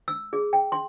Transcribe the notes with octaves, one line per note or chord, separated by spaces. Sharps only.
E6
G#4
G5
C6